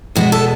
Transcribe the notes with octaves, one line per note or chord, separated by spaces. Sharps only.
E2 B2 G#3 B3 F#4
A4